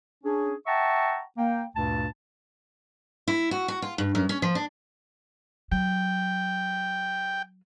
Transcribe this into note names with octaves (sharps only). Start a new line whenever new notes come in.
C#4 D4 G#4
E5 F#5 G5 A5 A#5 C#6
A#3 G5
D2 G2 A#2 A5
E4
F#4
F#4
F4
G2
F#2
C#4
F3
D4
F#3 G5